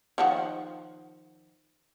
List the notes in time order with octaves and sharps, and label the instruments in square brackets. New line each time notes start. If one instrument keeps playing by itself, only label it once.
[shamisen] D#3 F3 F#5